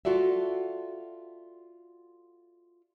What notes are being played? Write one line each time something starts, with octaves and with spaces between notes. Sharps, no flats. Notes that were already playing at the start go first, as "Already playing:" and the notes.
F4 F#4 A4 D5 E5